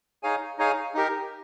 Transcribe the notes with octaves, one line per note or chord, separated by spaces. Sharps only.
D#4 G#4 C#5 F5 G#5
D#4 G#4 C#5 F5 G#5
D#4 G4 A#4